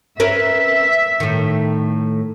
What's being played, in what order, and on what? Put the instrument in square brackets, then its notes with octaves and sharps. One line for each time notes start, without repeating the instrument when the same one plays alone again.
[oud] C#4 A#4 B4 [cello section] E5
[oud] A2 D#3